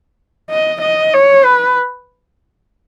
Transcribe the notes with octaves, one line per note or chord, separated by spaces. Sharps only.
D#5
D#5
C#5
B4